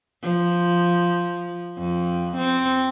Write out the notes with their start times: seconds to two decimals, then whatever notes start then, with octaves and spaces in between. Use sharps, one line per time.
0.23 F3
1.78 F2
2.37 C4